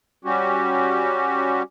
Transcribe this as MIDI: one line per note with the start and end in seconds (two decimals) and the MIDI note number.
0.25 1.62 55
0.25 1.62 61
0.25 1.62 66
0.25 1.62 67